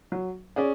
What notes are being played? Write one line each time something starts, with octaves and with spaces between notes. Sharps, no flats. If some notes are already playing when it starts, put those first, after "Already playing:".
F#3
C#4 G#4 D5